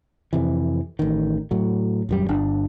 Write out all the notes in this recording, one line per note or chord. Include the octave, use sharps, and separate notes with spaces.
F2 C3 E3
A1 D#3
A2 F#3
D#1 F#2 G3
G1 D4